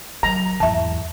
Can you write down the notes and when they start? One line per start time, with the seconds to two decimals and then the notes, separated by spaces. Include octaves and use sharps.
0.23 F#3 A#5
0.60 E2 G#2 E5 A5